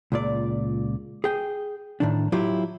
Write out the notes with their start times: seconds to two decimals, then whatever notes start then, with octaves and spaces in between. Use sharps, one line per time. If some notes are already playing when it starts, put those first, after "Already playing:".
0.12 C#2 A#2 D5
1.24 G#4 G5
2.00 A2 D#3 D4
2.32 F#3 E4 F4 G4